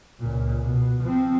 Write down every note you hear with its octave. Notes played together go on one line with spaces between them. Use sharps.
C#2 A#2
B2
F3 C4